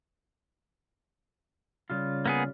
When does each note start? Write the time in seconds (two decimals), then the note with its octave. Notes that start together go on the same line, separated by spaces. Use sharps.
1.90 C#3 G3 F4
2.26 A#3 B3 G#4